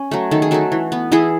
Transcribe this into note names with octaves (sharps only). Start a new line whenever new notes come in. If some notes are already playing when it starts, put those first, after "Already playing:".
Already playing: C#4
F#3 A3
D#3 A4
G#4
F#3 A3 F#4 A4
E3
B3
E3 E4 G#4